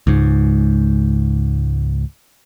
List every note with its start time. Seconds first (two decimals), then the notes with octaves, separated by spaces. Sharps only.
0.07 C#2 G#2